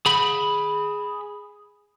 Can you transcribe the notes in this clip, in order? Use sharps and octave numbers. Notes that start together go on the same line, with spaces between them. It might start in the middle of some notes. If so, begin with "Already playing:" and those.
G#4 B5